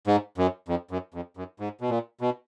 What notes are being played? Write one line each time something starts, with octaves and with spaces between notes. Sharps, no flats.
G#2
F#2
F2
F#2
F2
F#2
G#2
B2
A#2
B2